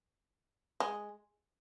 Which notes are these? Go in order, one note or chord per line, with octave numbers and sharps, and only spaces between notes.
G#3